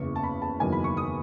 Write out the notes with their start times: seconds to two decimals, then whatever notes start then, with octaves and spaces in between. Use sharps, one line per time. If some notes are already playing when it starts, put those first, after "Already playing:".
Already playing: F#1 E2 C#3 C#6
0.16 A5
0.23 B5
0.42 A5
0.60 F#1 E2 D#3 F#3 G#5
0.72 B5
0.84 C#6
0.97 D#6